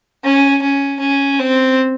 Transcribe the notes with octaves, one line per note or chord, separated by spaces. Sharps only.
C#4
C#4
C#4
C4